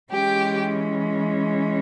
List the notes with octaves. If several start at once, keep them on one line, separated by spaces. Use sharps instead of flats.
E3 G#3 C#4 G4 G5